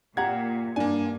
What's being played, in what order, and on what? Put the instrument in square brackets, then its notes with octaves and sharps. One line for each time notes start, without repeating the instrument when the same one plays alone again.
[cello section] A#2 [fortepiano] G4 F#5 A#5 [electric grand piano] G#6
[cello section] G2 [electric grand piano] A#3 G#5 [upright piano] D4